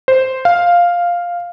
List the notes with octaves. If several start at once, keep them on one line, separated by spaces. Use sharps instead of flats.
C5
F5